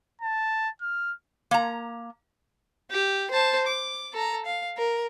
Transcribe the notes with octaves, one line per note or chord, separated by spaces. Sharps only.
A5
F6
A#3 A#5
G4
C5 A5
D6
A4 A#5
F5
A#4